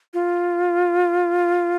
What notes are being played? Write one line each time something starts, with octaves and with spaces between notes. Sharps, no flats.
F4